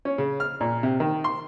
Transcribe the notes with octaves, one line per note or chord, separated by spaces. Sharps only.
C#4
C#3
F6
A#2
C3
D#3
C6